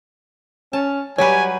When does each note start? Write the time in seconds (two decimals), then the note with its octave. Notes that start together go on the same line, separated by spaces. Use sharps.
0.73 C#4 A5
1.18 F#3 G3 G4 B4 C#5 G#5